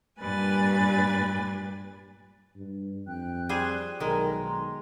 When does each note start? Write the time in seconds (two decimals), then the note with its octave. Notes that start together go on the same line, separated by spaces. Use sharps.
0.20 G2 A#2 G4 B4 G#5 A6
2.56 G2
3.07 F2 G5 F#6
3.49 G3 G#4 C5
4.00 B1 D#3 G#3 A4 A#4 A#5
4.44 A#5 C6